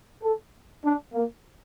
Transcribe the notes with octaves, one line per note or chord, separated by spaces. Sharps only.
A4
D4
A#3